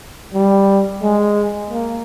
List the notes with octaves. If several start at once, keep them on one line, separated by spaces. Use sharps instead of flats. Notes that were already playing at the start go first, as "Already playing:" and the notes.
G3
G#3
A#3